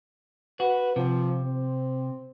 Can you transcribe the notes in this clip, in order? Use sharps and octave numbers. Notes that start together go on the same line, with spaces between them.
F#4 B4
C3 F3
C4